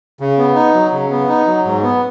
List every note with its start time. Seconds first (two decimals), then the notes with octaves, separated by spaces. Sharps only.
0.20 C#3
0.38 B3
0.55 D#4
0.74 F#3
0.92 C#3
1.10 B3
1.29 D#4
1.47 F#3
1.65 G#2
1.83 B3